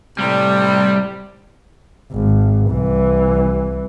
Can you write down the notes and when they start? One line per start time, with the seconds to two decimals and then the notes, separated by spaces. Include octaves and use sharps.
0.19 A2 C3 G3
2.11 G#1
2.70 C2 E3